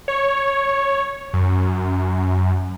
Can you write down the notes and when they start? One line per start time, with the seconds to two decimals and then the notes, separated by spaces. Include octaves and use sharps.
0.08 C#5
1.33 F#2